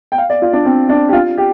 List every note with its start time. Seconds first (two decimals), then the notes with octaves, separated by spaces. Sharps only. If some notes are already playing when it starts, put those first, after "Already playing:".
0.12 G5
0.18 F5
0.30 D5
0.42 F4
0.53 D4
0.65 C4
0.89 D4
1.09 G4
1.13 F4
1.38 G4